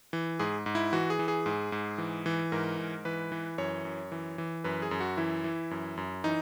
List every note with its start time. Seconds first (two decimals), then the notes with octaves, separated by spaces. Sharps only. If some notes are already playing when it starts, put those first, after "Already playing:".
0.13 E3
0.39 G#2 G#4
0.66 G#2
0.75 E4
0.93 E3 F#4
1.10 G#4
1.19 E3
1.28 G#4
1.46 G#2
1.72 G#2
1.98 E3
2.26 E3
2.52 G#2 A#4
2.79 G#2
3.05 E3 B4
3.32 E3
3.58 F#2 C#5
3.85 F#2
4.12 E3
4.38 E3
4.64 F#2 B4
4.82 G#4
4.91 F#2
5.00 F#4
5.17 E3 E4
5.44 E3
5.71 F#2
5.97 F#2
6.24 E3 D#4